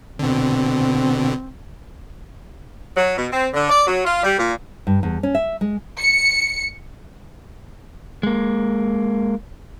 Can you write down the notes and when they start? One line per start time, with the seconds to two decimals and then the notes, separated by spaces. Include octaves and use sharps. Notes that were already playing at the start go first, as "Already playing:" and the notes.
0.19 B2 D3 C4
2.96 F#3
3.17 B2
3.31 C4
3.54 D3
3.69 D5
3.87 F#3
4.05 F4
4.23 G3
4.38 A#2
4.87 G2
5.03 E2
5.23 C#4
5.35 E5
5.61 G#3
5.99 C#7
8.23 G#3 A#3